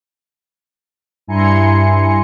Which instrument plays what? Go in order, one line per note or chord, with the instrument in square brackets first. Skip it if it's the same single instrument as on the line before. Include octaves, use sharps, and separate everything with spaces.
[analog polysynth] G2 E4 G#5 A#5 C6 C#7